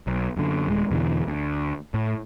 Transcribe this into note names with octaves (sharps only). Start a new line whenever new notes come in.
B1
F#2 D3
D#1 G#3
E2 B2 D3 E3
D2
A2